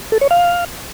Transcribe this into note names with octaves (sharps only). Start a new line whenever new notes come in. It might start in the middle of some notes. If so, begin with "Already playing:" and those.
A4
C#5
F5